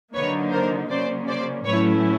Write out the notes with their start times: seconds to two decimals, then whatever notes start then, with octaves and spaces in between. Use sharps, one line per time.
0.14 D3 F#3 A#3 D#4 B4 C#5
0.51 A#4 C5
0.90 C#3 F#3 A#3 C#4 C5 D5
1.28 C5 D5
1.65 A2 F#3 A3 C#4 E4 B4 C#5